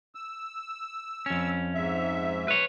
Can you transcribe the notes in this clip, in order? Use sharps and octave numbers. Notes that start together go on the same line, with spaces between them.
E6
F2 C#4
G#2 E5
B4 C#5